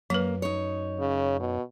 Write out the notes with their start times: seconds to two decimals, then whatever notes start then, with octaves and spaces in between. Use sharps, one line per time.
0.10 F#2 F#3 A#3 B4
0.42 D#4 C#5
1.00 C#3
1.40 B2